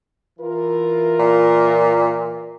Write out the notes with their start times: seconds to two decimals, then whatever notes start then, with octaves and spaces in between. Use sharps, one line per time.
0.39 E3 F4 A#4
1.19 A#2